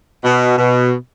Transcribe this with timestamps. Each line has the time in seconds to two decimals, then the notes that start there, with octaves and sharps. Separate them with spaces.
0.24 B2
0.58 B2